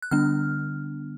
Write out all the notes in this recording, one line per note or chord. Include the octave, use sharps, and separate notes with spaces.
F#6
D3 G3 B3 D4 F6